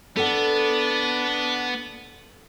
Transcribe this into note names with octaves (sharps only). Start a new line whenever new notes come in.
B3 D4 A4 F#5